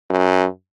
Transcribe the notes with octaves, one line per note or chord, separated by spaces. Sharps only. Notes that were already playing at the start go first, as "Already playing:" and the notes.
F#2